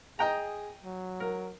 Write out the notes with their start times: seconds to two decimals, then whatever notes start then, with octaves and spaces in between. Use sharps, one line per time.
0.19 G#4 D#5 G5 A#5
0.84 F#3
1.20 A#4